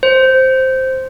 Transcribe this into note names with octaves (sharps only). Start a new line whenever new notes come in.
C5